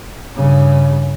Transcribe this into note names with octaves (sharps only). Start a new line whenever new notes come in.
G2 C#3